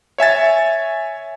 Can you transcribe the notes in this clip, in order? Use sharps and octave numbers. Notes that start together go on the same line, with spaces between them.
C#5 E5 G#5 A6